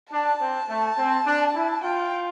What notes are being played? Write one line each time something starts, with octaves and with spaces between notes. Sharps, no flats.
D4 A5
C4
A3
C4
D4
E4
F4 G5